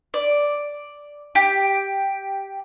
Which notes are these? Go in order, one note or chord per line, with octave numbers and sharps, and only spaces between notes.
D5
G4